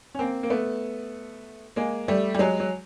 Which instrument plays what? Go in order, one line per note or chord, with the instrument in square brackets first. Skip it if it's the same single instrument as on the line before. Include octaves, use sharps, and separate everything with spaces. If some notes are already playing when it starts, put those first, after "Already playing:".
[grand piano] C#4
A#3 C4
A#3
A3 B3
G#3 A#3
G3 A3
G3
F#3 G#3
F#3